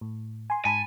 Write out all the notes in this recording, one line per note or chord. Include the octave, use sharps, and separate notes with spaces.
A2
G#5 C6
G#2 G#5 A5 B5